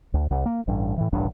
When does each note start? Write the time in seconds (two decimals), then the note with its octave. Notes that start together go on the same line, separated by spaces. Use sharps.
0.14 D2
0.31 C2
0.46 A#3
0.68 A1 G2
0.98 A2 E3
1.13 D#1 A1 G2 D4